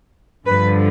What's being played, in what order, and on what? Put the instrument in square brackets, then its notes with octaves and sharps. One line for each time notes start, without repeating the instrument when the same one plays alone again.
[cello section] G2 D3 F3 B4